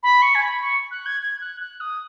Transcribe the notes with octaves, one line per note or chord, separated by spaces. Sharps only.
B5
C#6
G#5
B5
C#6
F#6
G#6
G#6
F#6
F#6
D#6